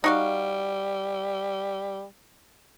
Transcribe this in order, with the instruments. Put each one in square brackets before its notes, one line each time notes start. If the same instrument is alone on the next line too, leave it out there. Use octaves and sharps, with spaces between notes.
[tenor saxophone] G3 [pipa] D#4 F#4 F5